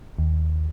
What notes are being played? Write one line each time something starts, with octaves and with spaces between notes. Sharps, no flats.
D#2